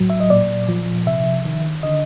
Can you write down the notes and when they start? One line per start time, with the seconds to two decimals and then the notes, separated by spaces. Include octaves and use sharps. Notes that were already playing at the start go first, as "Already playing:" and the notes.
Already playing: A2 F#3
0.10 E5
0.20 D#5
0.30 A#2 D5
0.69 F3
1.07 C3 E5
1.45 D#3
1.83 D3 D#5